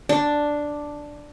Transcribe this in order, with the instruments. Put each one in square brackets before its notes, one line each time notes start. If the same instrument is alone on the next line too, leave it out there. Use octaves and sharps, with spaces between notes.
[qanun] D4